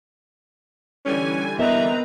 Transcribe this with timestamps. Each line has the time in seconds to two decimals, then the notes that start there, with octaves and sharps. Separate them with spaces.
1.05 D3 E3 G3 C#4 G#5
1.59 B3 C4 A#4 B4 D#5 E5 A#5